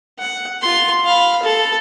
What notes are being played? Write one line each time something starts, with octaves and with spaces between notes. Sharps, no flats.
F#5
F4 C6
F5 B5
A4